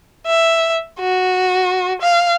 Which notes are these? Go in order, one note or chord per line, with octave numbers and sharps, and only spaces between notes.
E5
F#4
F5